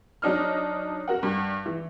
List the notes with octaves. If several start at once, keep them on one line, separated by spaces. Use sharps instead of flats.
F#3 D4 D#4 F6
F#4 A#4 F#5
G2
E3